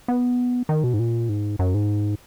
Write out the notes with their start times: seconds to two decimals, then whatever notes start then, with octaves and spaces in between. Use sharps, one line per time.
0.08 B3
0.69 D#3
0.84 B2
0.94 G#2
0.99 A#2
1.29 G#2
1.59 F#2
1.74 G#2